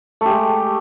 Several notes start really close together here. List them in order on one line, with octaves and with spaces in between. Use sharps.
A3 G4 G#3